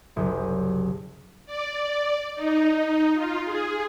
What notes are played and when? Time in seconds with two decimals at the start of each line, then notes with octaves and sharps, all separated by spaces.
0.16 F#1 C2 G#5
1.46 D5
2.35 D#4
3.14 F4
3.44 G#4